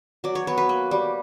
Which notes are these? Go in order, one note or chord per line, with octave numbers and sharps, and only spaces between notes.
F#3 D5
C#5
B3 C#5
B4
A#3
G3